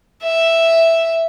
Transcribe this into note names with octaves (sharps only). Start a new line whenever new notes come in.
E5